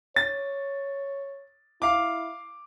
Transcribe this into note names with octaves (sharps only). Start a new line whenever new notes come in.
C#5 A6
E4 F5 D6